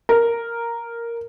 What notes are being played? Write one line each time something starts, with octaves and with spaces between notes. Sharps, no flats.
A#4